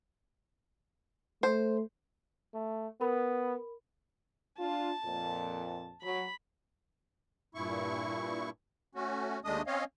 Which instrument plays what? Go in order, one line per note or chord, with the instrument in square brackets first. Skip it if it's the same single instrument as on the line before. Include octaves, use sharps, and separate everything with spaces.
[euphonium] A3 [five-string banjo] C5
[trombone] A3
[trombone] B3 [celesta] A#4 B5
[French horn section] D4 F4 [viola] A5
[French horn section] F2 A#2
[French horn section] F#3 [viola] B5
[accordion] G2 A#2 E4 C#6
A3 C#4 F#4
D#2 G#3 A3 D4 D#5 D#6
C4 C#4 C#5 D#5 F5